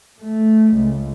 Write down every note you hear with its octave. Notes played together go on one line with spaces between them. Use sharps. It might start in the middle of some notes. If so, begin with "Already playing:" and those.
A3
C#2